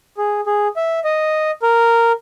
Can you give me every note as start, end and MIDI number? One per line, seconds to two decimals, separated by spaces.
0.18 0.41 68
0.47 0.68 68
0.76 1.00 76
1.04 1.51 75
1.62 2.12 70